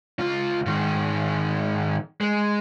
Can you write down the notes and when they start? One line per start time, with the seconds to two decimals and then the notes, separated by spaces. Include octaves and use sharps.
0.19 C#2 F4
0.66 G#2 D#3
2.21 G#3